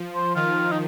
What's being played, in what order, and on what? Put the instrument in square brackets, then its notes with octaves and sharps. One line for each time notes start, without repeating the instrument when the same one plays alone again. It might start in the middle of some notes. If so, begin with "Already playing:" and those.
Already playing: [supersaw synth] F3
[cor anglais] C5
[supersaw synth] D#3 [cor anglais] F4
[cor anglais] D#4